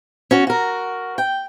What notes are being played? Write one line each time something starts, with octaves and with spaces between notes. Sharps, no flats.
C#4 F#4
F#4 A#4
G5